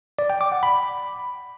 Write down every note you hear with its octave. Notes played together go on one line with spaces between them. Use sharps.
D5
G5
D6
F#5
B5